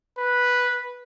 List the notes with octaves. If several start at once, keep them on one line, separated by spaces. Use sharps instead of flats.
B4